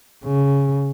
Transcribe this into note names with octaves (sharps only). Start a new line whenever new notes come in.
C#3